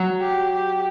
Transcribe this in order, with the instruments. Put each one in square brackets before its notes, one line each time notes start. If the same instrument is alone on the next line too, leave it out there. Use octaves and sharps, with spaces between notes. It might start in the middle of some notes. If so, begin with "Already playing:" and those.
Already playing: [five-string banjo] F#3
[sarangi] G4
G4